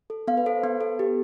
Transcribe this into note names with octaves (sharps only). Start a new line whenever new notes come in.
A4
B3 F5
B4
A4 C5
B3 B4
A4
G4